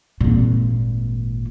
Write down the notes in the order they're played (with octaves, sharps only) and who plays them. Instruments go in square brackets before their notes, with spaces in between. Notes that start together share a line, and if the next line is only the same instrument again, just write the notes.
[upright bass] G#1 A#2